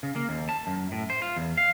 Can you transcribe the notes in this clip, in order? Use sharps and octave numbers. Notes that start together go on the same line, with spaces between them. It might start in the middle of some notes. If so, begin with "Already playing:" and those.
C#3
A#3
D#2
A5
F#2
A2
C5
F4
E2
F5